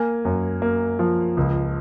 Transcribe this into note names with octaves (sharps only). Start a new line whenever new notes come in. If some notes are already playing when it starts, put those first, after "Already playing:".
Already playing: A#3 G#5
F#2
A#3
F3
C#2